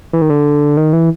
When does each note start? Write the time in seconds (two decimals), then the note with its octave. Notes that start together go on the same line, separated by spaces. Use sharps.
0.13 E3
0.22 D#3
0.30 D3
0.77 D#3
0.93 E3